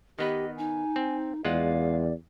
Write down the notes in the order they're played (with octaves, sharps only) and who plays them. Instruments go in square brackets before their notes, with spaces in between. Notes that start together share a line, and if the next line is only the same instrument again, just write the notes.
[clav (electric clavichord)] D#3 B3 B4 [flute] G4 [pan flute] D#5
[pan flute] D#4 [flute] G#5
[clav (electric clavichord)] C4
[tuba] E2 [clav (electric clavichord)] G#3 F4 F#5 [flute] D5 [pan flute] F5